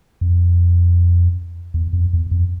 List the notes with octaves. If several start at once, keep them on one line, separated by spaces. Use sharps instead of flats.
F2
E2
F2
E2
F2